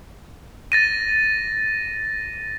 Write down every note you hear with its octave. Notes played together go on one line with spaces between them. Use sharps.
A6 A#6 D#7